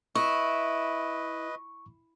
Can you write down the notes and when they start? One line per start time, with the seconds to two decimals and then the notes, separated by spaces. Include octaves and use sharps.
0.15 E4 B4 D#5 C#6